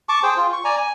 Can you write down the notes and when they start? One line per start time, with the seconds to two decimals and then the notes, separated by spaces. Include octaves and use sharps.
0.09 A5 C#6 D6
0.23 G#4 C5 G5
0.37 F4
0.53 C#6
0.64 D5 G#5 A#5
0.78 G#5